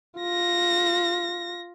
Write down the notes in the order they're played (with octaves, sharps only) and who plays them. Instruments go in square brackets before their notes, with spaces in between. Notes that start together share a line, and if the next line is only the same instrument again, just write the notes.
[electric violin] F4 A#6